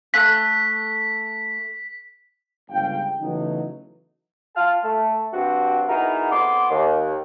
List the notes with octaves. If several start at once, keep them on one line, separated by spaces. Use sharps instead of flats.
A3 F#6 B6
G1 C#2 C#3 F5 G5
C#3 E3 F#3 A3 B3 D#4
F4 A5 F6
A3
G2 C4 F#4
B3 D#4 E4 F#4 G#4 A#4
F2 B3 C6 D6
D#2